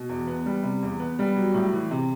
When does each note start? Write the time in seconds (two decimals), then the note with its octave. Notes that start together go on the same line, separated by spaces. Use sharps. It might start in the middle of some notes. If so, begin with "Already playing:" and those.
Already playing: B2
0.09 E2
0.27 B3
0.46 G3
0.63 C3
0.82 E2
1.00 B3
1.19 G3
1.36 F#3
1.54 A2
1.73 E3
1.91 C3